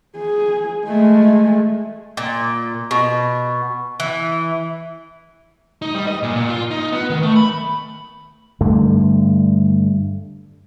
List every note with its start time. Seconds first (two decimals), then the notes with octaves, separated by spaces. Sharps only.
0.18 G#4
0.86 G#3 A3
2.17 A#2
2.91 B2
4.00 E3
5.82 D#4
5.95 G3
6.07 D#5
6.23 A#2
6.36 A#2
6.49 F4
6.71 D#4
6.92 B3
7.10 D#3
7.23 A3
7.36 B5
8.61 G2 D3 A3